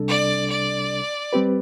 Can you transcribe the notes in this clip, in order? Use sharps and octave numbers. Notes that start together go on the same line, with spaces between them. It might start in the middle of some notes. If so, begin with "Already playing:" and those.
Already playing: C2 C3 G3 D4 A4
D5
D5
G3 C4 G4 B4